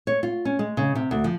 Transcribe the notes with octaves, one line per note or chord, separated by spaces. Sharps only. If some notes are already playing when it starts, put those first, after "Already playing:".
C#5
F4
C#4
G#3
C#3
C3
D2
F3